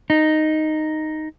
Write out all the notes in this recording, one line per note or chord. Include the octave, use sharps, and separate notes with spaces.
D#4